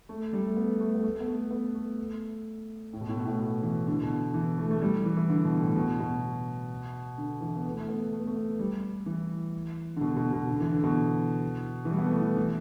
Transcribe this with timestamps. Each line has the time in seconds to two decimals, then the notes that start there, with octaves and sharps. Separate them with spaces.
0.09 A3
0.33 G3
0.46 A3
0.57 B3
0.80 A3
0.95 B3
1.03 A3
1.20 B3
1.28 A3
1.51 B3
1.75 A3
2.93 A2
3.01 B2
3.09 A2
3.17 B2
3.26 A2
3.40 B2
3.63 E3
3.87 D3
4.03 B2
4.34 E3
4.58 A3
4.70 A3
4.82 G3
5.05 E3
5.17 E3
5.29 D3
5.45 B2
5.60 A2
5.76 B2
6.00 B2
7.18 D3
7.41 E3
7.56 B3
7.66 A3
7.79 A3
7.88 B3
8.13 A3
8.20 B3
8.27 A3
8.36 B3
8.59 G3
9.06 E3
9.96 D3
10.01 B2
10.17 B2
10.33 B2
10.48 D3
10.60 E3
10.72 D3
10.84 B2
11.85 E3
11.90 G3
11.98 B3
12.06 A3
12.21 E3
12.37 E3